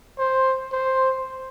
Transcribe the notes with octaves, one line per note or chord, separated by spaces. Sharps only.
C5
C5